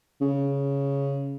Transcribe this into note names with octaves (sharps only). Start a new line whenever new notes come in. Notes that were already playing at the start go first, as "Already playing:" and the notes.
C#3